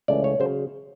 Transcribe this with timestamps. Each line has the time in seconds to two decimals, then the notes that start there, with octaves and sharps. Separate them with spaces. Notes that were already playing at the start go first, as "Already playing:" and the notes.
0.08 C#2 C#3 E3 A3 C#4 D5
0.24 C#5
0.40 C#3 F#3 C5